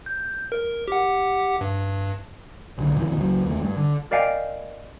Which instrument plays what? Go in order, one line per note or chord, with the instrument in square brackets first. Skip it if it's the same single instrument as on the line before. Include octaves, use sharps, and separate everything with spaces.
[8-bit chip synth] G6
A#4
G4 F#5
G2
[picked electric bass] B1 D3
F2 B2 D#3 E3
C#2 F#3
E2 D#3 G3 A3
G2
D3
[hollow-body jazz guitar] A#4 D5 D#5 F5 G5 G#5